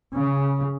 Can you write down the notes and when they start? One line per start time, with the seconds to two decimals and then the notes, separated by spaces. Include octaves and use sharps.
0.15 C#3